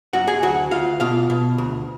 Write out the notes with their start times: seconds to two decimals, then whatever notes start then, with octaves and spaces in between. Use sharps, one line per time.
0.13 F#2 F#4 F#5
0.28 G#4 G#5
0.43 D2 F#4 F#5
0.71 D2 F4 F5
1.00 B2 F4 F5
1.30 B2
1.58 D2